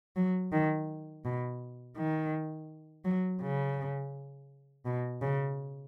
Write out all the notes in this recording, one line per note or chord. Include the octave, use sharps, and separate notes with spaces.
F#3
D#3
B2
D#3
F#3
C#3
B2
C#3